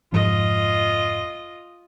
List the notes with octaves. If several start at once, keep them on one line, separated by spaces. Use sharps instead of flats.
F1 G#2 F3 F4 D#5